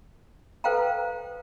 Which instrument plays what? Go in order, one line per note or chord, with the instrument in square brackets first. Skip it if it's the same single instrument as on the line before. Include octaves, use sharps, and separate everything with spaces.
[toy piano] A4 B4 C5 F5 G5 A#5